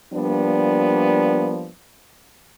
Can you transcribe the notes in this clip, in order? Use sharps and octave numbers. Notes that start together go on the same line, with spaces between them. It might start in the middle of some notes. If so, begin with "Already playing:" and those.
F3 G3 A#3 B3 D4